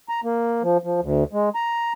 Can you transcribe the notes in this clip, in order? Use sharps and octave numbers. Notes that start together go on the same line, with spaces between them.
A#5
A#3
F3
F3
D2
G#3
A#5